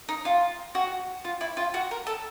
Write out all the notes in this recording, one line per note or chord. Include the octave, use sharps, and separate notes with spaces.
D#4
F4
F#4
F4
E4
F4
F#4
A#4
A4